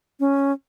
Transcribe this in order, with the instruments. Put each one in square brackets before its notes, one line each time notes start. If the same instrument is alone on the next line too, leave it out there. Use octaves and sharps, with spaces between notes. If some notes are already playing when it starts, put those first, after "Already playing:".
[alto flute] C#4